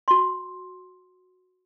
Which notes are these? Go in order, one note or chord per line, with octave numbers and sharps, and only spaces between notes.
F#4 C6